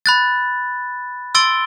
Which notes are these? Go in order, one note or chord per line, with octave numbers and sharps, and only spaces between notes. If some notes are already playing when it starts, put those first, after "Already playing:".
B5 F#6 A6
C6 E6 A6 D7 G7